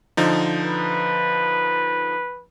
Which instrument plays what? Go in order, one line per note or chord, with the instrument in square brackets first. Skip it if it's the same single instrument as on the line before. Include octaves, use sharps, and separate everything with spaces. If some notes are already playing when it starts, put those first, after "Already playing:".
[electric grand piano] D3 F3 D#4
[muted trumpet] B4